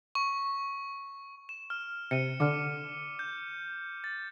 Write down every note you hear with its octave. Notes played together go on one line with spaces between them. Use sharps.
C#6
E7
F6
C3 C#7 D#7
D3 D6 F6
G6
A6